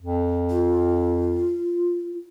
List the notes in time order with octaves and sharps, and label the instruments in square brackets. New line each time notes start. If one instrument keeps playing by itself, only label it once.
[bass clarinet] F2
[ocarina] F4